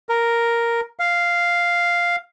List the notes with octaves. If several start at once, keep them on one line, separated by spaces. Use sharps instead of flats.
A#4
F5